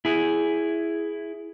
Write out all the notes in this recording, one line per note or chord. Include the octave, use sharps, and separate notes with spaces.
E4 G#4